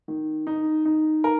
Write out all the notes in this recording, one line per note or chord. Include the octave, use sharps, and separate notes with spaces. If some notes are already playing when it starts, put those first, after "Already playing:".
D#3
D#4
D#4
A#4